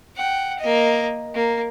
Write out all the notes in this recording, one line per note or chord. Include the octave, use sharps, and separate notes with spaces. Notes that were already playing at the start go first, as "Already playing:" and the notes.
F#5 G5
A#3 D#5
A#3